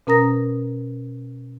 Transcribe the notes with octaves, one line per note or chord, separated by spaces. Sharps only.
B2 C#4 A#4 A#5 D#6 A#6